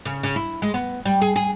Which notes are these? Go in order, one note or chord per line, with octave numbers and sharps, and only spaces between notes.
C#3
C#3
E4
G#3
B3
G3
G#4
G#4